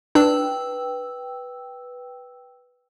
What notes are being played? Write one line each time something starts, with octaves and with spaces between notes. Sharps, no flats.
D4 B4 G5 E6